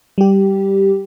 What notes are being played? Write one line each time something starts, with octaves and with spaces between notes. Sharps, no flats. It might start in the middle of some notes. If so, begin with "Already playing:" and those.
G3 G4